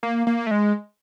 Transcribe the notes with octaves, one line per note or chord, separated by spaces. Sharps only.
A#3
A#3
A3
G#3